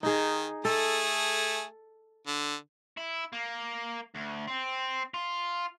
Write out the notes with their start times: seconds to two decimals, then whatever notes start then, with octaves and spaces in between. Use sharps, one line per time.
0.03 D#3 D#4 G#4
0.65 A3 G#4 A4
2.27 D3
2.97 E4
3.33 A#3
4.15 D2
4.48 C4
5.14 F4